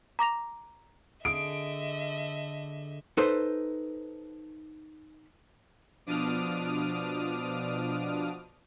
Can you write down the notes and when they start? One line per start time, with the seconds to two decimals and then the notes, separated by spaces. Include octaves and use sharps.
0.19 A#5 D6 A#6 F7
1.25 D3 G#4 D#5 E5 D#6 D7
3.17 D#4 A4 B4 C5
6.06 B2 F3 D4 D6 D#6 F6